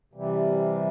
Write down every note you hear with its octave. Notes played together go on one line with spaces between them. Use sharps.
C3 E3 G3